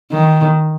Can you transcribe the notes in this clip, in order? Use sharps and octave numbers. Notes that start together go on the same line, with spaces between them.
D#3